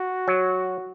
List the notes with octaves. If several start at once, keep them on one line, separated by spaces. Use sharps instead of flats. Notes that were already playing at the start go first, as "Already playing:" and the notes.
Already playing: F#4
F#3